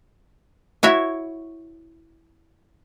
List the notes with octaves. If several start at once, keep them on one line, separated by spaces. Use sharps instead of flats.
E4 F#4 C#5 E5